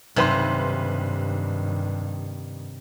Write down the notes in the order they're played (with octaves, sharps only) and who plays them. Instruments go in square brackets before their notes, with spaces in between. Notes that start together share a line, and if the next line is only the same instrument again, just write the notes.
[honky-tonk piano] B1 B4 C6 [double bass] G2 D#3 [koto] C3